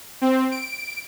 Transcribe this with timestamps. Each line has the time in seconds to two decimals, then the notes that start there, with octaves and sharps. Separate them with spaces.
0.21 C4
0.51 D7